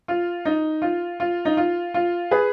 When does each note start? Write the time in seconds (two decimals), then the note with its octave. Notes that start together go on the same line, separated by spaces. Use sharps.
0.08 F4
0.45 D#4
0.82 F4
1.20 F4
1.45 D#4
1.57 F4
1.94 F4
2.31 G#4 B4